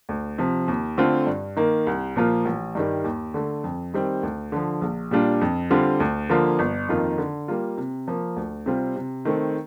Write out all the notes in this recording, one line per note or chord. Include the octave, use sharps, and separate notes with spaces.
D2
C3 F3
D#2
D3 A3 C4 F4
G2
D#3 A#3
C2
A#2 F3 A#3 F4
A1
G2 D#3 G3
D#2
D3 A3
F2
D#3 G3 C4
D2
D3 F3
A#1
A#2 G3 D4 F4
F2
D3 G3 C4 F4
D2
D3 F3 A#3 F4
G1
F2 D#3 A#3 F4
D3
G3 A#3 F4
C3
F3 A#3
D2
C3 G3 C4 F4
C3
D#3 A3 C4